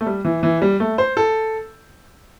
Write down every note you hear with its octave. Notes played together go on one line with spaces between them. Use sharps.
A3
G3
E3
E3
G3
A3
C5
A4